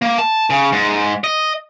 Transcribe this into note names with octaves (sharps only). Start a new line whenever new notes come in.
A#3
A5
C#3
G#2
D#5